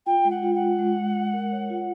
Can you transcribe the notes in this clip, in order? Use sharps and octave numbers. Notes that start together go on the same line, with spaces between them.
F4 G5
G#3
F#5
F4
F#5
G#3
G#3
G#3
G#3
A#4
C#5
F4